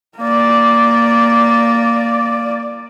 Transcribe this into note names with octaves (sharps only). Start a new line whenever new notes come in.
A#3 D5